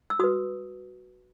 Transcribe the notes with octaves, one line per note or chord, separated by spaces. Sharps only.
E6
F#4 B4 D#6